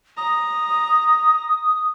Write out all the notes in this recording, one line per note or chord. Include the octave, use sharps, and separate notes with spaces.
A#5 D#6